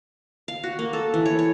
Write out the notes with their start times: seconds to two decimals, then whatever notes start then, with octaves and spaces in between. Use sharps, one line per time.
0.48 F5
0.64 F#4
0.79 A#3
0.93 A4
1.14 E3
1.26 C#5
1.39 C#5